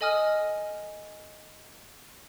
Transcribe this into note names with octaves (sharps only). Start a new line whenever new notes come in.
A4 D#5 G#5 D#6 F6